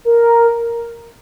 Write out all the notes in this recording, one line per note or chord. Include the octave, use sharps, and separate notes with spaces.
A#4